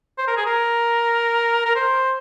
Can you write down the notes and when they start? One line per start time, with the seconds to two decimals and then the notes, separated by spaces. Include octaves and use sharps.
0.18 C5
0.28 A#4
0.37 G#4
0.46 A#4
1.66 A#4
1.76 C5